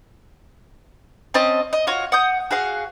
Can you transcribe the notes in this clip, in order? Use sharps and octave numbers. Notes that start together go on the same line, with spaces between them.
C4 C#4 D#5 A5
D#5
F4 F#4 C#5
F#5 D#6 G6
F#4 G#4 F5 F#5